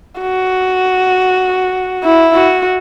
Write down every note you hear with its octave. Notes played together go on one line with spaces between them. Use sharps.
F#4
E4
F#4